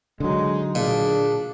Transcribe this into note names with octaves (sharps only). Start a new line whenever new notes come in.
D3 F#3 G#3 D#4
A#2 D4 G#4